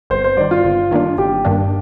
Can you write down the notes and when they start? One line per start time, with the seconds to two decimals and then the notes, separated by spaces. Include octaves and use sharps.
0.10 G1 C5
0.24 C5
0.37 G2 D#3 D5
0.51 F4
0.65 G1
0.91 G2 D#3 A#3 D4
1.18 G1 G4
1.45 G2 D#3 A#3 D4